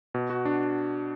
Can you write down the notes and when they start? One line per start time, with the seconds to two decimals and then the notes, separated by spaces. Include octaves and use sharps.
0.14 B2
0.30 F#4
0.45 D4